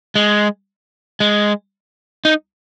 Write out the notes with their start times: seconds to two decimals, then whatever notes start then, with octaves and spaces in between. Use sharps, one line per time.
0.16 G#3
1.20 G#3
2.25 D#4